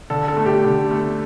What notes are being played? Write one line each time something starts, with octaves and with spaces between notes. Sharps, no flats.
D3 A4
A4
A3
G4
D3
A3